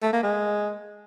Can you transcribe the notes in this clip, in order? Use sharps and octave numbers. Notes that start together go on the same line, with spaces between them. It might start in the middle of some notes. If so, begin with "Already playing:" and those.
A3
A#3
G#3